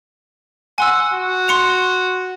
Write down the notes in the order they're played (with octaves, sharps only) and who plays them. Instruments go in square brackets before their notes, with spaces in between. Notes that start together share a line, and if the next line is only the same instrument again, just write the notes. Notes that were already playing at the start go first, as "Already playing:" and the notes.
[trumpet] F#5 [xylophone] G#5 C6 E6
[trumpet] F#4
[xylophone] C6 C#7 F7